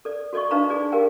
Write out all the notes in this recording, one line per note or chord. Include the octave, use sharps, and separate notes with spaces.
A4 D5
F#4 A4 D5 D#5 C#6
D4 D#4 B4 F5 A#5 B5
D#4 G#4 D5
G4 G#4 A#4 F5 G5